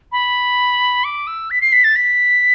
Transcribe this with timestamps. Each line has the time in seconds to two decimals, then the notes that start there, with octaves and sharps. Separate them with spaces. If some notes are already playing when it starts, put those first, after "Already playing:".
0.12 B5
1.04 D6
1.27 E6
1.51 B6
1.62 C7
1.73 B6
1.84 A6
1.96 B6